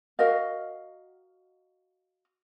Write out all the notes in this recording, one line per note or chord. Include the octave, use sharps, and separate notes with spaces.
F#4 A#4 D#5 F5